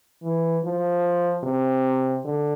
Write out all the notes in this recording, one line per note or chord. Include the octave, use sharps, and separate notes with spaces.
E3
F3
C3
D3